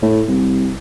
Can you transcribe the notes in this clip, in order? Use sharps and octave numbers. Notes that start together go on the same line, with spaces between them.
A2
C2